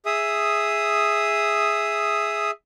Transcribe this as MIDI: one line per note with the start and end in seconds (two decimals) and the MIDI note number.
0.06 2.51 68
0.06 2.51 76
0.06 2.51 87